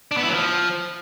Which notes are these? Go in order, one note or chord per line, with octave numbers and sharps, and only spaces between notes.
D4
B3
E4
F#3
F3